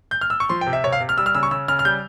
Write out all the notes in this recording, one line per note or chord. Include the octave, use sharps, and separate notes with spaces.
G6
F6
E6
C#6
F3 C6
G5
C3
E5
C3 C#5
F5
C3
F6
G3 E6
F6
C#3 E6
C#6
C#3 E6
C#3 F6
F6
G3 G6